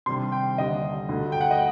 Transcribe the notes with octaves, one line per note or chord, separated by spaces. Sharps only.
C3 D#3 G3 D4 C6
G5
D#2 D3 G3 D#5
D2 D3 A3
G5
F#5
D#5